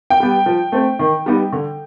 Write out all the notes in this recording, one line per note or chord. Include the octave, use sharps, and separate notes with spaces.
G5
G3 B3
F3
A3 C4
D#3
G3 B3 D#4
D3